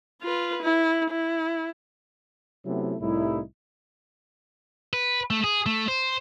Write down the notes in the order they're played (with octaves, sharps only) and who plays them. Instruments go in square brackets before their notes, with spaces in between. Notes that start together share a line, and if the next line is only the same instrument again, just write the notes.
[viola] F4 B4
E4
E4
[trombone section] C3 F#3 A3 B3 C#4 E4
C2 A2 G3 D#4 E4
[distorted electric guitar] B4
A3
G#4
A3
C5